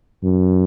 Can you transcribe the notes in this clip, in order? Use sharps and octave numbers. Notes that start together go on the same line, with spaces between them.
F#2